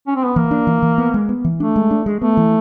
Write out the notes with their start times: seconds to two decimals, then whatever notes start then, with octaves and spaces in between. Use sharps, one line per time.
0.07 C#4
0.16 C4
0.26 B3
0.36 E3 A#3
0.51 D4
0.67 E3
0.83 E3
0.98 B3
1.14 G#3
1.29 B3
1.45 E3
1.60 A3 D4
1.76 G#3
1.91 D4
2.06 G#3
2.22 A3 B3
2.37 E3